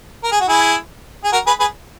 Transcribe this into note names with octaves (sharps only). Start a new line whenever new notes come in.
A#4
G#4
F#4
E4 G#4
G#4
F#4 A#4
G#4 B4
G#4 B4